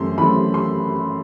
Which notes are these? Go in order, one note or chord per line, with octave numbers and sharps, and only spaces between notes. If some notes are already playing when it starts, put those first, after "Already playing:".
Already playing: F#2 E3 A3 C4 C6
F#2 E3 A3 C4 B5
C6